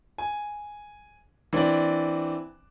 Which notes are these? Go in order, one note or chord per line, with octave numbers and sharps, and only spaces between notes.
G#5
E3 C4 D4 D5